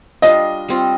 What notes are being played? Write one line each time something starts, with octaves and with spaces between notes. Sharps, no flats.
G3 D4 F4 D#5
G3 C4 F4